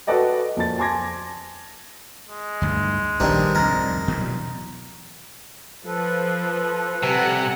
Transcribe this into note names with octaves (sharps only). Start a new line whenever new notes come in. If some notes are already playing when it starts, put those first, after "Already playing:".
F#4 A4 B4 D5 D#5 G5
F2 A#3 A5 A6
G#5 A5 C6 D6 G#6 A#6
G#3
D2 G2
A#1 G2 D#3 C4 D4
C2 F2 G#2 A#4
B2 E3 F#3
F3 A4 B4
C3 G3 F#5 G#5